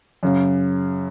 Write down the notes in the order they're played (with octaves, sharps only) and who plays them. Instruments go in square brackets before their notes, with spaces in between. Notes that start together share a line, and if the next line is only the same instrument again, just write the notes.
[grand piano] F#2 C#3